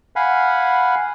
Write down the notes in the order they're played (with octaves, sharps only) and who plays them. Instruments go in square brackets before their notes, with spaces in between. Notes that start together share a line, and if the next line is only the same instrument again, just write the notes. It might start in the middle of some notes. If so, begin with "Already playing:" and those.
[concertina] F5 F#5 G#5 B5